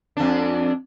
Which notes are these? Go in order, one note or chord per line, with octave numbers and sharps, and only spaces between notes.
F2 D4